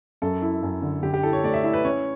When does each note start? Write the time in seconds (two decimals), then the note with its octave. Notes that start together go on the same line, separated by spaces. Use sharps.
0.22 F#2 A4
0.42 E4
0.63 F#2
0.82 D3
1.02 D3 G4
1.14 G4
1.23 E4 A4
1.33 C#5
1.44 A3 D5
1.54 E5
1.64 E4 E5
1.73 B4
1.84 C#4 C#5